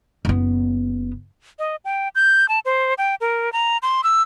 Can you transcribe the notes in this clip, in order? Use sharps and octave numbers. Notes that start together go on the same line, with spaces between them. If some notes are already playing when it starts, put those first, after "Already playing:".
F#1 B3
D#5
G5
G6
A5
C5
G5
A#4
A#5
C6
E6